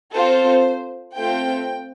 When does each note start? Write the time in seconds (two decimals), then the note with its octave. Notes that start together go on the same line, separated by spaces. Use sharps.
0.13 C4 F4 A4 C5
1.15 A3 C4 F4 A4 G5